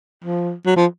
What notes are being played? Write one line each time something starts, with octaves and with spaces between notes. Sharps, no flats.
F3
F#3
F3